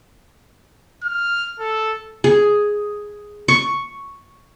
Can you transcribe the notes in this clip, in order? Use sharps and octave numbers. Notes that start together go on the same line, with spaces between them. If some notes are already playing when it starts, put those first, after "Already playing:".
F6
A4
G#4
C#6